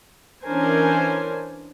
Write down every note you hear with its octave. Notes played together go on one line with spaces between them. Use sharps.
E3 C#4 D4 A#4 C5 G#5